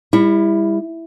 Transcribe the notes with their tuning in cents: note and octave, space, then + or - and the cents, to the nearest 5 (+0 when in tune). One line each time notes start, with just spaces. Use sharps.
G3 +35 E4 +0